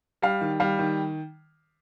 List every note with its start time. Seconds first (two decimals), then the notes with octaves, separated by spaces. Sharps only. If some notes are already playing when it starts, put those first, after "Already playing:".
0.22 G3 F5
0.41 D#3
0.60 G3 F5
0.79 D#3